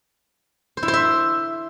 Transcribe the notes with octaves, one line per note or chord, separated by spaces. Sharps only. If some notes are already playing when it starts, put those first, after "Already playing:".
C5
E4
C5
E5